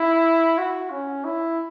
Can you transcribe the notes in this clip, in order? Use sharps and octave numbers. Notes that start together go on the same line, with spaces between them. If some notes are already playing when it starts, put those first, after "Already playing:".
Already playing: E4
F#4
C#4
E4